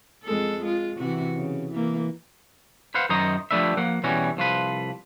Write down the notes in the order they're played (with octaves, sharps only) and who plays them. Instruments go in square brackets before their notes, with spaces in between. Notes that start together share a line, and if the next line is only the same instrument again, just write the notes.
[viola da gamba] F2 G#3 A4
G#3 F4
C3 E3 F#4
C#3
E3 A#3
[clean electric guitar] B4 C5 F5 F#5
F#2 D#3 C5 D#5 A#5
F3 G3 A3 D4 B4 E5
F3 A#3 F#5
B2 E3 G3 C#4 F#4
C2 F3 F4 B4